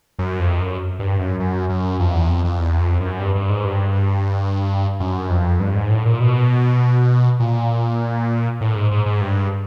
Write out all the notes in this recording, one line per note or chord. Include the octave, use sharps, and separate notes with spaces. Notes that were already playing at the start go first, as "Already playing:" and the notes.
F#2
F2
F#2
G2
F#2
F#2
F#2
F2
E2
F2
F2
E2
F2
F#2
G2
G2
G#2
G2
F#2
F2
G2
G#2
A2
A#2
B2
A#2
A2
G#2
G#2
G#2
G2